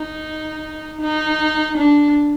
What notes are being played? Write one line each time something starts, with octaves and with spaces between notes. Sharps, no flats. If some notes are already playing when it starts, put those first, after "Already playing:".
Already playing: D#4
D#4
D4